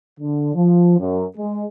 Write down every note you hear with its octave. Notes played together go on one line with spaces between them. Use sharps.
D3
F3
F#2
G#3